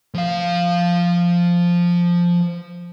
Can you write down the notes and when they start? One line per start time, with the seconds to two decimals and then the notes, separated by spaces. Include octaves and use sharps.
0.14 F3 F5